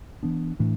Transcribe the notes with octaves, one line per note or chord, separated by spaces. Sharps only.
E3 B3 D4
A2 E3 A3 D4